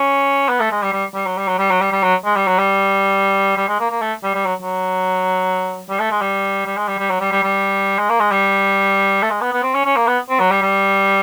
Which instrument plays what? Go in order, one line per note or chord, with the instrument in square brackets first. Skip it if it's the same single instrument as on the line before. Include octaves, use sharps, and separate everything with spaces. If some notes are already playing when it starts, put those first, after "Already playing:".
Already playing: [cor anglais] C#4
B3
A3
G#3
G3
G3
G3
F#3
G3
F#3
G3
F#3
G3
G3
F#3
G#3
G3
F#3
G3
G3
G#3
A#3
A#3
A3
G3
G3
F#3
F#3
G3
A3
G#3
G3
G3
G#3
G3
G3
F#3
G3
G3
G3
G#3
A#3
G#3
G3
A3
G#3
B3
B3
C4
C#4
C#4
A#3
B3
C4
F#3
G3
G3